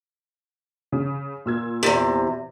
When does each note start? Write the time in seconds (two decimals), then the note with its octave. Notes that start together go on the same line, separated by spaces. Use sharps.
0.92 C#3
1.46 A#2 E6 G#6
1.83 E2 C3